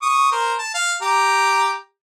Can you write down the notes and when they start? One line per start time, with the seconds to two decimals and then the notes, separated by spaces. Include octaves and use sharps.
0.02 C#6 D#6
0.32 A#4 C5
0.58 A5
0.75 F5
1.02 G4 A#5